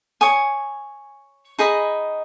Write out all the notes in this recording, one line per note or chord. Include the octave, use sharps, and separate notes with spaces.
C#5 G#5 D#6
D#4 G#4 D#5 B5